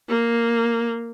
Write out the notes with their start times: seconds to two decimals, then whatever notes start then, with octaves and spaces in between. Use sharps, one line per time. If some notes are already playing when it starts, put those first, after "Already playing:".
0.09 A#3